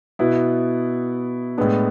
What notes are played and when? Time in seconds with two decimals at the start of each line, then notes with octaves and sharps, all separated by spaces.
0.19 B2 B3 E4
1.58 A2 G#3 B3 D4